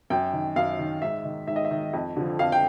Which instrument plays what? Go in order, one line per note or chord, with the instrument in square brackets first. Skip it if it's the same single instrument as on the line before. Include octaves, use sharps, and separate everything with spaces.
[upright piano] F#2 G5
D#3
F#2 F5
D#3
G#2 E5
D#3
G#2 E5
D#5
E5
D#3
F2
D3 F3
F2 F5
G5